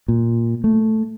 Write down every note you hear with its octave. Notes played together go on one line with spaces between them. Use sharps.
A#2
A3